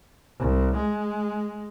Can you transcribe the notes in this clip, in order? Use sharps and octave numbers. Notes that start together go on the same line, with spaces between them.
C2
G#3